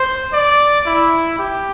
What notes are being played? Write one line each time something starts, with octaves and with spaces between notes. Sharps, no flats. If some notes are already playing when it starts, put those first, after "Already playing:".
Already playing: C5
D5
E4
G4